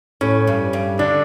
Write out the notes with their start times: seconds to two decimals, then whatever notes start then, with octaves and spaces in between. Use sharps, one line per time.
0.21 A2 C#4
0.47 G2
0.73 G2
0.99 D3 D4